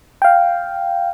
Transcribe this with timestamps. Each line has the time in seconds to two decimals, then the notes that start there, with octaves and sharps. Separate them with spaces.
0.22 F5 G5